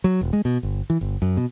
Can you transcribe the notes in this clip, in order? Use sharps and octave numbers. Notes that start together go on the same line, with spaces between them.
F#3
E1
G#3
B2
G1
E3
G1
F#2
B2